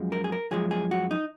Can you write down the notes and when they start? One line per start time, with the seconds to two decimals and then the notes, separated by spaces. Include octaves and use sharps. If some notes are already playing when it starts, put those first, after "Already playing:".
Already playing: F#2 F3 G#3
0.12 A#4
0.24 G#4
0.32 A#4
0.51 F#2 F3 G#3 G#4
0.71 G#4
0.91 F#4
1.11 D#4